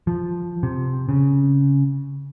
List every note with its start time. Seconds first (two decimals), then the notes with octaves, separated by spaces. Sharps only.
0.07 F3
0.63 C3
1.09 C#3